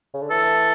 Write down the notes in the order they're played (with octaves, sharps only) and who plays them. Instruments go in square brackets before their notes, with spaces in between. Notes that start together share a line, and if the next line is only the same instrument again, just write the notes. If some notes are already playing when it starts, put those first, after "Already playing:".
[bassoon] C#3
D3
[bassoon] E3 [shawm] A4